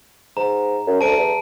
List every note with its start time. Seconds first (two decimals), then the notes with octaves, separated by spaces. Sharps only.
0.37 G#2 A#5
0.87 F#2
1.01 D2 A5 D7
1.17 E2